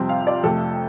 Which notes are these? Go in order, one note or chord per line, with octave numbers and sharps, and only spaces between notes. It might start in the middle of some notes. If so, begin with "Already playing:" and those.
Already playing: F2 C3 G3 C4 C6
F5
D5
F2 C3 A3 A4